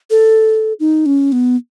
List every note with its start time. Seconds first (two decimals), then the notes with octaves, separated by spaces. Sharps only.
0.10 A4
0.80 D#4
1.06 C#4
1.32 B3